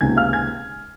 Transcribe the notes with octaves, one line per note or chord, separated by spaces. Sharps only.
C#2 C3 D#3 A#3 G#5 G#6
F5 F6
G#5 G#6